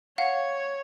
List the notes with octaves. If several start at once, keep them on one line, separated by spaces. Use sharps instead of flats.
C#5 F5 F#5